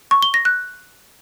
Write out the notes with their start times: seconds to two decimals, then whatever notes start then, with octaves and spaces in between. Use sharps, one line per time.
0.11 C#6
0.22 G7
0.34 A#6
0.45 F#6